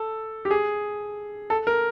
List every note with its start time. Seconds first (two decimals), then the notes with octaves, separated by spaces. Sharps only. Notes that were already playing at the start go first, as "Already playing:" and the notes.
Already playing: A4
0.45 G4
0.51 G#4
1.50 A4
1.67 A#4